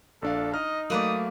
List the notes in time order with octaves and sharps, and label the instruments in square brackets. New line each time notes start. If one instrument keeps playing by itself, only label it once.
[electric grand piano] A#1 D4 F5 [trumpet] A4
[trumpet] D#4 [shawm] D#5 [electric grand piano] F6
[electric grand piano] F#3 A3 [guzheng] A#3 B4 D5 [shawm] D#6